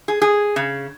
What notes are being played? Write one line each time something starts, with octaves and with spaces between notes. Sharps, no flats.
G#4
G#4
C#3